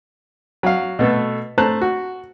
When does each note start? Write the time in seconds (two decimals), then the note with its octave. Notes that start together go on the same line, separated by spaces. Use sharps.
0.63 F#3 F5
0.99 B2 A3 B3 A4
1.58 A3 C5 A5 A#5 F#6
1.81 F#4